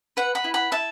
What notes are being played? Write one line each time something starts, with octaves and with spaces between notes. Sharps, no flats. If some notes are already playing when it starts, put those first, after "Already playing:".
B4 F#5
F#5 B5
E4
F#5 B5
E4 E5 A5